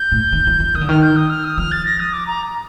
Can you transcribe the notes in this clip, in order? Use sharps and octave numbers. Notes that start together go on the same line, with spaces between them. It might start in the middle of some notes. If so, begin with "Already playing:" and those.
Already playing: G6
A2
D#3
F3
F3
D#3 D#6
D3
D#3 F6
G6
D#6
F6
D#6
F3 F6
A6
A#6
D#6
D6
A#5